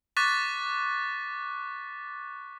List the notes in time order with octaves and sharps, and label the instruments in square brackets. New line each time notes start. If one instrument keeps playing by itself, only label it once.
[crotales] C#6 D6 F#6 A6 B6